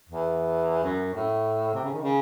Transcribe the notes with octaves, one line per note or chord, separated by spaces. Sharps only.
E2
F#2
A2
C3
C#3
D#3
C#3